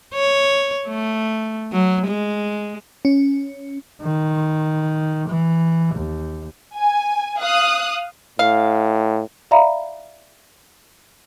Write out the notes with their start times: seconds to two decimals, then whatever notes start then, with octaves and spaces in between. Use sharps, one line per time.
0.14 C#5
0.87 A3
1.72 F#3
2.07 G#3
3.05 C#4
4.02 D#3
5.28 E3
5.95 D#2
6.76 G#5
7.41 F5 D#6 F#6
8.39 A2 F5
9.51 D5 E5 F5 A#5 B5